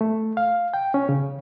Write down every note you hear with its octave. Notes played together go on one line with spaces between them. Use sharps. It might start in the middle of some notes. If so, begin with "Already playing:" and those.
A3
F5
G5
C#4
C#3